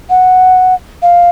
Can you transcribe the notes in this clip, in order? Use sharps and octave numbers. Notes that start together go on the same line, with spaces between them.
F#5
F5